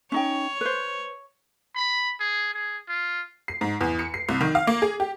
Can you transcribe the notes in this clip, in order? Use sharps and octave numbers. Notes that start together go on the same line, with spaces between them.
C#4 D#4 C#5 G5
B4 C5
B5
G#4
G#4
F4
C7
G#2
E2
C#7
C7
C2
D#3
F5
A#3
G#4
G4